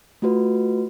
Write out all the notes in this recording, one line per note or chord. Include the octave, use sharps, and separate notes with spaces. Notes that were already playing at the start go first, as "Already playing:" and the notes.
A3 F4 F#4 B4